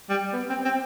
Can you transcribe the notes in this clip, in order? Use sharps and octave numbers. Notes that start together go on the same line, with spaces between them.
G3
B3
C4
C4